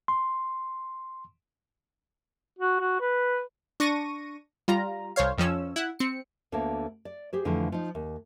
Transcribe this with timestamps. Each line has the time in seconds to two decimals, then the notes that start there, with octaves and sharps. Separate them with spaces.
0.08 C6
2.59 F#4
2.80 F#4
3.00 B4
3.80 D4 C#6 A#6 D#7
4.68 G3 F4 A#5
5.16 C2 C5 C#5 F5
5.38 F2 F3 C#4 E6
5.76 E4 F#5
5.99 C4 C#7
6.52 D2 D3 A#3 B3 C#5 A5
7.05 D5
7.33 G4 G#4 C5
7.45 F2 D3 E3 F3 A3
7.72 F3 D#4
7.95 D#2